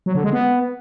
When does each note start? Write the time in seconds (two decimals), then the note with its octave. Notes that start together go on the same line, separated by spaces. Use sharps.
0.06 F#3
0.15 D3
0.24 G#3
0.33 B3